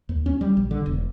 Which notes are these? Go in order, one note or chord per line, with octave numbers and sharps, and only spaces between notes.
D#2
C#4
G3
A#1
D3
E1